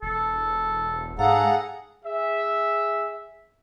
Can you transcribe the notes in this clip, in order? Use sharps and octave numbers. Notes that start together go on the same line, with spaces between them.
E1 A4
G#2 G#4 A4 F5 F#5 A#5
G#4 E5